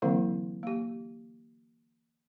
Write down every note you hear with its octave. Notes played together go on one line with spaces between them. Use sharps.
D3 E3 F#3 A#3 C4 E4
A#3 G4